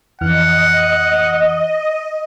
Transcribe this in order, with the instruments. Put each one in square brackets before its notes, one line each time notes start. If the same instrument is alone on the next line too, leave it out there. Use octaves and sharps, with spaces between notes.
[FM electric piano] F2 E3 F6 [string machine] D#5 [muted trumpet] F#5